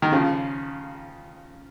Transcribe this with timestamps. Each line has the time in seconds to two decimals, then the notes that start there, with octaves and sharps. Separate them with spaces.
0.02 D#3
0.12 C#3 F3